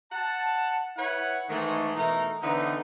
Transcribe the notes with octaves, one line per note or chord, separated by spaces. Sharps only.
F#5 A5
E4 B4 C#5 F#5
G#2 D#3 E3 G#3 A3
B2 E3 A3 D#4 A#4 A#5
D3 E3 B3 C4 D#4